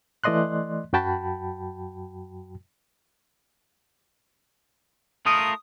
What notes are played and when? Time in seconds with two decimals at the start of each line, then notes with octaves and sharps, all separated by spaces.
0.24 E3 A3 D5 D#5 C6 F#6
0.93 F#2 F#3 F#4 G5 A5 B5
5.26 A3 F4 A#4 D#6